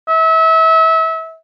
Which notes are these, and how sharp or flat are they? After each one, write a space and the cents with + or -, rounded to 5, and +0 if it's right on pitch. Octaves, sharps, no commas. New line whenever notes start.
E5 -30